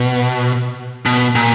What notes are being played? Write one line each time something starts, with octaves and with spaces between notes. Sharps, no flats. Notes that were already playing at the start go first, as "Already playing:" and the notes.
Already playing: B2
B2
A#2